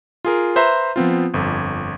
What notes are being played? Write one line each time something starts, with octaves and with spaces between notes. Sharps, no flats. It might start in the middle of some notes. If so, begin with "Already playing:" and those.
F4 G#4 A#4
B4 C5 E5 A#5 C6
F3 B3 C4 F4
G1 F2